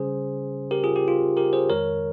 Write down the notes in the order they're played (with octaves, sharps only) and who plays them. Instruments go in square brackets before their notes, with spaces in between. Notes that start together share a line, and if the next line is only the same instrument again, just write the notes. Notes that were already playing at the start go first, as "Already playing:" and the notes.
Already playing: [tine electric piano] C#3 G3 C#4 G#4 C5
G4 A#4
F4 G#4
G4
F4
G4 A#4
G#4 C5
F2 D#3 G#3 A#4 C#5